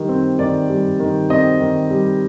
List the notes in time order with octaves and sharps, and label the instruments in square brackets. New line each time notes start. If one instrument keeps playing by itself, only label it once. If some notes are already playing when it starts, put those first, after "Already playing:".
Already playing: [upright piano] D#3 G3
C4
D#3 D5
G3
D#3
C4 D#5
D#3
G3